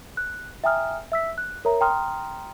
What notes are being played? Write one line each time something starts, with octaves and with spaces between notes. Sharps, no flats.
F#6
E5 G5 G#5 A#5 D#6 F6
E5 E6 B6
F#6
A#4 C#5 E5 A#5
G5 A#5 C6 D#6 F6